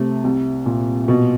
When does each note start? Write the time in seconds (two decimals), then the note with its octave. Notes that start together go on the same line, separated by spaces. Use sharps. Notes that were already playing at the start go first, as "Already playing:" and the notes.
Already playing: C3 A3
0.24 C2
0.66 A#2
1.08 B2